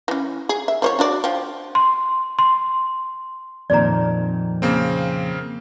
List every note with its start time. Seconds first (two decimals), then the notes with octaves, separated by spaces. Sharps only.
0.08 E3 C#4
0.49 G#4
0.68 E5
0.82 F3 C5 C#5
0.99 D4 F#4 D5
1.24 F3 G5
1.75 C6
2.39 C6
3.70 F2 A#2 D#3 D5 A#5
4.62 C#3 A#3 C4